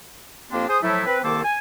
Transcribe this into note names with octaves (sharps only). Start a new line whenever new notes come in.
F2 A#3 C4 D4 G4 C6
G#4 C5 D#6
A2 F3 F#3 A3 E4
C4 B4
C2 D#3 A#3 A4 C5 D6
G#5